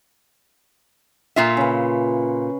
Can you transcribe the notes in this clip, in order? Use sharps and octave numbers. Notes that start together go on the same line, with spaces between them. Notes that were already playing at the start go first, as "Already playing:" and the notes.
A#2 F4 E5
C#3 B4